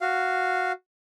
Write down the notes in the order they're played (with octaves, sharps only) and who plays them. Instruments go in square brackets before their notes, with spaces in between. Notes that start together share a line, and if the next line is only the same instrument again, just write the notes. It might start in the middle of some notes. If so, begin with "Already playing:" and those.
[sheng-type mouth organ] F#4 F5